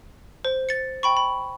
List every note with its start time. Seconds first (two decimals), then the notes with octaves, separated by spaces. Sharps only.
0.45 C5
0.69 A6 C#7
1.03 G5 B5 C#6
1.17 B5